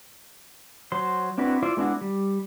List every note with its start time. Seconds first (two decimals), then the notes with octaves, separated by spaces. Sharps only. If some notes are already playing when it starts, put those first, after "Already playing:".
0.92 F#3 C5 C6
1.38 C4 D4 E4 F#4 B4
1.62 E4 F4 C5 D5
1.77 G#3 B3 D4 E4 F#4
2.01 G3